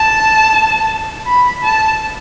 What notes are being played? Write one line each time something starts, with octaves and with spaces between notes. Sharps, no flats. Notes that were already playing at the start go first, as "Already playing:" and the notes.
Already playing: A5
B5
A5